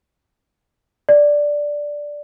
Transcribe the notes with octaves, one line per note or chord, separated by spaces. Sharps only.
D5